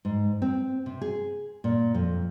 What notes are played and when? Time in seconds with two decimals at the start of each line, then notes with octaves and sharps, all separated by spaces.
0.05 G#2
0.42 C4
0.86 C3
1.01 G#4
1.64 A#2
1.95 F2